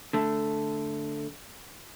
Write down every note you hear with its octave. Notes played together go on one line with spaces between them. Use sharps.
D3 A3